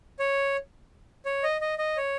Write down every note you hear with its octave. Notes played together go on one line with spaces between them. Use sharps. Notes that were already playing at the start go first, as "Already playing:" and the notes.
C#5
C#5
D#5
D#5
D#5
C#5